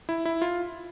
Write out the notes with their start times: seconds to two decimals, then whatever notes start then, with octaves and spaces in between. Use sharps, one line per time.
0.09 E4
0.25 E4
0.42 F4